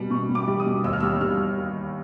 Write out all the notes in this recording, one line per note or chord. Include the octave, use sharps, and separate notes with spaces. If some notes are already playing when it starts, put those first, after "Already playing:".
Already playing: B2 G3
B2 C#6
B2
D6
G3
D#6
B2
D#2 E6
F6
G3 E6
G3 F6